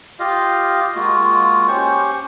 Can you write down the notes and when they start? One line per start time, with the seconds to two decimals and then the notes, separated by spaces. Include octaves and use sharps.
0.20 F4 G4 D#5 F5
0.96 G#3 A#3 F4 F#4
1.68 C#4 G4 C5 C#6